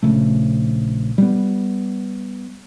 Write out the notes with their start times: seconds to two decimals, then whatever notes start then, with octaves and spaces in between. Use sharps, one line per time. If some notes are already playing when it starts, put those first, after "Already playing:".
0.03 A#1 C#3 A3
1.18 G3 B3